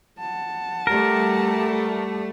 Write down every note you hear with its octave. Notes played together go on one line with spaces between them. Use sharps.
F#5 A5
G3 A3 G4 A#4